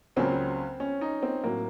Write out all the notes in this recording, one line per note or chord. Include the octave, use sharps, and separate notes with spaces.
C#2 C#3 F#3 A#3 C4 C#4
C#4
D#4
C4
A2 F#3 A#3 C4 F#4